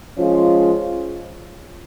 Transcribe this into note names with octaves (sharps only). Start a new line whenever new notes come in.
F3 G#3 C#4 F4